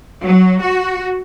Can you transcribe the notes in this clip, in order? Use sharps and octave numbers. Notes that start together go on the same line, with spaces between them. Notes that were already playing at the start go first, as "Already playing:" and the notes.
F#3
F#4